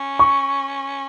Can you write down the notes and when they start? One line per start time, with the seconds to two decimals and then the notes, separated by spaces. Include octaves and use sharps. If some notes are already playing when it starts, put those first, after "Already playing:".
Already playing: C#4
0.19 C#6